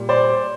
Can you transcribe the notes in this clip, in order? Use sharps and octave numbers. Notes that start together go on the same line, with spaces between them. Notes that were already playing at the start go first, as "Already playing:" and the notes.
Already playing: A#2 G3
C5 D5